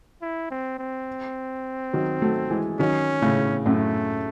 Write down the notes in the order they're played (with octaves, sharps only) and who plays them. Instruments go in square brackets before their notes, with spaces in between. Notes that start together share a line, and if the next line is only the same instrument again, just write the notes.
[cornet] E4
C4
C4
[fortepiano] D#3 F#3
F#3 A3
E3 G#3
[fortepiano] D#3 F#3 [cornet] C#4
[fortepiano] A2 C#3
[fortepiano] F#2 A2 [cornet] A3